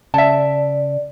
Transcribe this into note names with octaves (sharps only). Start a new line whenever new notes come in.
C#3 D5 E5 A5